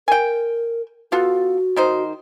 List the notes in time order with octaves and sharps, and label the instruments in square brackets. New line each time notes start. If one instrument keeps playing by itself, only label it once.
[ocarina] A#4 [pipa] G5 G#5
[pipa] B3 F4 A4 [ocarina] F#4
[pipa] D#3 D#4 C5